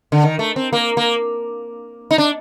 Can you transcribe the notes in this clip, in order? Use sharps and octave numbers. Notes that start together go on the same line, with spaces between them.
D3
D#3
A3
C4
A#3
A#3
D#4
D4